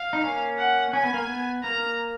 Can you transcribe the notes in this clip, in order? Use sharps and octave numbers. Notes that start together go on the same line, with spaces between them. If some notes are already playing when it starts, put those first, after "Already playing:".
Already playing: F5
D#4
A#3 C#4
F#5
C#4 G#5
B3
A#3
B3
A#3 A#5